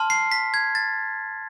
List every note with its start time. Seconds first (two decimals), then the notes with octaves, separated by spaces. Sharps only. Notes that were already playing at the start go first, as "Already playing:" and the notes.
Already playing: A5 C6 F6
0.10 C7
0.32 B6
0.54 G#6
0.75 A6